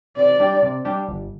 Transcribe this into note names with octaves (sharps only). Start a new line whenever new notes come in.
C3 D5
G3 D4 G4
C3
G3 D4 G4
G1